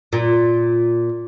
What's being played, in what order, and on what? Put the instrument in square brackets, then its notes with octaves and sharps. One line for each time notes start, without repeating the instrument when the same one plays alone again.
[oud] A#2